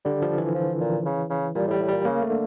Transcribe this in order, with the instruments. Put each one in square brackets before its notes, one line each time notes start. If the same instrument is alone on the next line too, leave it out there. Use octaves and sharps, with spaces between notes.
[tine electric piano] D3 [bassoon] G3
[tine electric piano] F3
E3
[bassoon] F3
A#2
C#3
C#3
[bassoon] A#2 [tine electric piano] G3
[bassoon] A2
[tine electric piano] G3
[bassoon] A2
[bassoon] A#2 [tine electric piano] G3
[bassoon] C#3 [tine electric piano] A#3
[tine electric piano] A3
[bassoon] D3